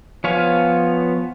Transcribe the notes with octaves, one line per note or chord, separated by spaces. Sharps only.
F3 B3 C#5 F5 G#5